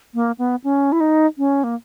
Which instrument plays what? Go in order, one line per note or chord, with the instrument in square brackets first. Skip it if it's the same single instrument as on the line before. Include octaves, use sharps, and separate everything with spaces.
[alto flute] A#3
B3
C#4
E4
D#4
C#4
A#3